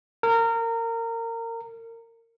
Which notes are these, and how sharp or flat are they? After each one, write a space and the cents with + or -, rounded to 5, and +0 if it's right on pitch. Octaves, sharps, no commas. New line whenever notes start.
A#4 -25